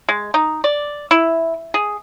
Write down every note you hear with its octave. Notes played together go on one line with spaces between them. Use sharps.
G#3
D#4
D5
E4
G#4